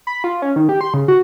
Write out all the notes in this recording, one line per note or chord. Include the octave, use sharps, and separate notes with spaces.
B5
F4
C#4
D#3
G4
C6
C#3
F#4